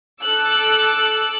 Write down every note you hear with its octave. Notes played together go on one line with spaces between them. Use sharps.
A4 D6 E6 F#6